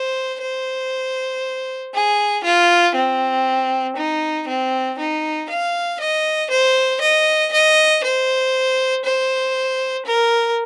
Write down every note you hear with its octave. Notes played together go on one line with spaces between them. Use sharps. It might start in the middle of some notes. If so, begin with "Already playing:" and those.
Already playing: C5
C5
G#4
F4
C4
D#4
C4
D#4
F5
D#5
C5
D#5
D#5
C5
C5
A#4